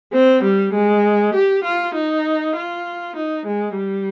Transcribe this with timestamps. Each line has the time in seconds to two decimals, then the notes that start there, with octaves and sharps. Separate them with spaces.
0.12 C4
0.44 G3
0.74 G#3
1.34 G4
1.64 F4
1.95 D#4
2.56 F4
3.16 D#4
3.46 G#3
3.76 G3